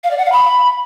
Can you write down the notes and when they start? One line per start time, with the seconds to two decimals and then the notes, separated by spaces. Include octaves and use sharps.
0.04 F5
0.11 D5
0.18 F#5
0.25 F5
0.32 B5